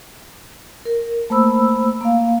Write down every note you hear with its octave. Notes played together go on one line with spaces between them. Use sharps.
A#4
A3 A#3 C5 B5 E6
A#3 F5